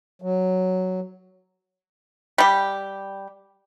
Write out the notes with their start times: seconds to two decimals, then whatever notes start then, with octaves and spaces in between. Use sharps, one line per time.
0.22 F#3
2.38 G3 G4